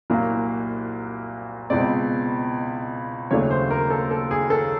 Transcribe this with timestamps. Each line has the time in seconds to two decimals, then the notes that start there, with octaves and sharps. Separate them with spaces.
0.10 C2 A#2 F#3 A#3
1.70 C#2 B2 G#3 C4 D5
3.31 D#2 C#3 F#3 A3 D4 C#5
3.51 C5
3.71 A#4
3.90 A4
4.11 A4
4.31 G#4
4.50 A4